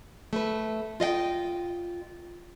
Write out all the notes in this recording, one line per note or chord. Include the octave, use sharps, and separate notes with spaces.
A3 B4
F4 D#5 F5 G5